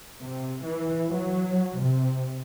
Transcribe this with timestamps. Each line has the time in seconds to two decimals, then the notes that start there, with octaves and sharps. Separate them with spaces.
0.20 C3
0.63 E3
1.10 F#3
1.80 C3